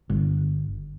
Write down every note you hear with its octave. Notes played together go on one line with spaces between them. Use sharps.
G1